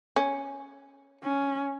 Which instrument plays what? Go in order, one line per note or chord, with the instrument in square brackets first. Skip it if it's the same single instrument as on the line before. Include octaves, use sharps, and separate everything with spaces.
[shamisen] C#4
[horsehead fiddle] C#4